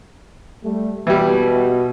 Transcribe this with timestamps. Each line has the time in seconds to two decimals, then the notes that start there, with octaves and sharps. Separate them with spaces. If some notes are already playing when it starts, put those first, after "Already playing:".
0.64 G3 A3
1.07 B2 E3 G3